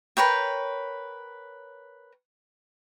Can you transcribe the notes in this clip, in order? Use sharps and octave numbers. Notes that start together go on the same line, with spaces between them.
A#4 B4 C#5 G5